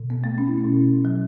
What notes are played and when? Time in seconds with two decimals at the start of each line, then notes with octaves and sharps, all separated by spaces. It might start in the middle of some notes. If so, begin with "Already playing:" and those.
Already playing: B2
0.10 B3
0.24 A3
0.38 C#4
0.48 E4
0.58 C#4
0.64 B2
1.05 F#3